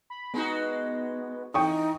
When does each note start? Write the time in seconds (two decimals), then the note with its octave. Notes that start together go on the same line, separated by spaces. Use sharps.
0.10 B5
0.34 G#3 B3 D#4 F#4
1.54 E3 D#4 G5 C#6 D#6